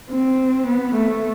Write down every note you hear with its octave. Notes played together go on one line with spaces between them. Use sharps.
C4
B3
A3